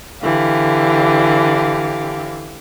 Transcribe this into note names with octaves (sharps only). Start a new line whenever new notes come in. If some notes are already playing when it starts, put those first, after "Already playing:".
D3 E3 G4 F5